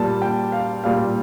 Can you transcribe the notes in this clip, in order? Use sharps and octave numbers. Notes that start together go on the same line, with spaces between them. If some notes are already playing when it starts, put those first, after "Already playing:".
Already playing: A#2 G3 A#3 A5
G5
F5
A#2 G3 A#3 F5